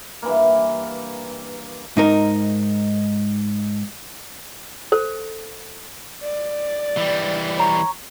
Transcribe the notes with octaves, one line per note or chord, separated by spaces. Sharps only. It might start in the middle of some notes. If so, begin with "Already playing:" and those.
G2 E3 A#3
G#2 D#4 A#4
A4 C5
D5
E3 G3
C#5 A#5 C#6